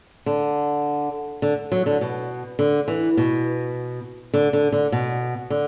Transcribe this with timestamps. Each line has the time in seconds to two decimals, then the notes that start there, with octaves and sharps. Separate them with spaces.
0.26 D3
1.42 D3
1.72 F#3
1.86 D3
2.01 B2
2.59 D3
2.88 E3
3.17 B2
4.34 D3
4.53 D3
4.72 D3
4.92 B2
5.50 D3